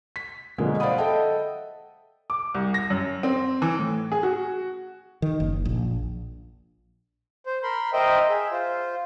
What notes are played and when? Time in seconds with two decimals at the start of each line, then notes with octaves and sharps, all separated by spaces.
0.16 B6
0.58 B2 D3 F3 F#3 G#3 A#3
0.80 C5 D5 F5 F#5 B5 D#6
0.98 A4 D#5 E5 F#5 G5 A5
2.30 D6
2.55 C2
2.74 A#6
2.90 F#2
3.23 C4
3.62 E3
3.79 A2
4.12 G#4
4.23 F#4
5.22 D#3
5.40 F#1
5.65 A#1
7.46 C5
7.63 A#4 B5 C6
7.93 A#4 C5 D#5 E5 G5
8.29 G#4 E5
8.51 F4 C5